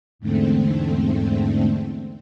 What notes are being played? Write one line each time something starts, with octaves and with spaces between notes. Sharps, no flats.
E2 G#2 D3 A3 C4